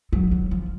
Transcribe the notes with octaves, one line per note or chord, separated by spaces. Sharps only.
F#3
F#3
F3